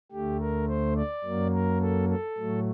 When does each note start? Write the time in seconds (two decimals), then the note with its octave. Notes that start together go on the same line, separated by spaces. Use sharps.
0.12 D2 D3 A3 G4
0.40 A#4
0.68 C5
0.97 D5
1.24 F#2 F#3 A#3
1.53 A#4
1.81 A4
2.09 A4
2.37 A2 F#3 A3